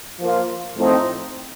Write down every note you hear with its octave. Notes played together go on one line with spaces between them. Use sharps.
F3 A#3 F4
A2 F3 A3 C4 D#4